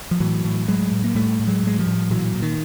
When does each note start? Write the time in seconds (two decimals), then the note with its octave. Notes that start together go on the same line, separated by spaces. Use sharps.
0.11 F3
0.20 A2 E3 F#3
0.44 A2
0.68 A2 F#3 G#3
0.92 A2
1.04 A#3
1.15 A2 G3 A3
1.40 A2
1.48 F#3 G#3
1.63 A2 G#3
1.79 F3 G3
1.87 A2
2.10 A#2 E3 F#3
2.34 A#2
2.42 D#3